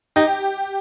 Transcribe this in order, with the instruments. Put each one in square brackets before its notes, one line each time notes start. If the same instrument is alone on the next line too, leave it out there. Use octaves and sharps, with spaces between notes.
[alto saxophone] D#4 [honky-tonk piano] G4